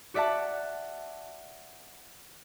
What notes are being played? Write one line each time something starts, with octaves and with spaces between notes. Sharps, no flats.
F#4 D5 E5 F#5 A5